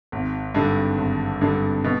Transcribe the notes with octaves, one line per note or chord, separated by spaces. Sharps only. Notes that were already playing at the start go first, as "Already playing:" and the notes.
G#1
G2 D3
G#1
G2 D3
B2